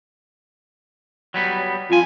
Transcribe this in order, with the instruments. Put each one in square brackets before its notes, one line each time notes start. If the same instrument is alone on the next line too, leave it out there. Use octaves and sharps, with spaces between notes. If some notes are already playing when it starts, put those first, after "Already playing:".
[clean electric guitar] F#3 G3 B3
[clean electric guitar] F2 G#5 [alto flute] F4